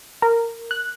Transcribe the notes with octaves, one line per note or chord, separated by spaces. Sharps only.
A#4
F#6